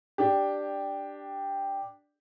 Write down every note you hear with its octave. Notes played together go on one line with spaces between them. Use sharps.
D4 G4